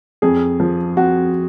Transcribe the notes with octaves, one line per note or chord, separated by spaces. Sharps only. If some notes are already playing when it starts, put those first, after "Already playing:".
F2 G#4
F3
F2 F#4